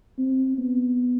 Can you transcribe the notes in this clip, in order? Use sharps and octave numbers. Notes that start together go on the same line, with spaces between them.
C4
B3